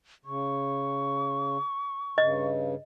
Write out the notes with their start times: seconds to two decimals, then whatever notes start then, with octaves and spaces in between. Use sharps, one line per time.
0.25 C#3 C#6
2.18 G2 C#3 D#5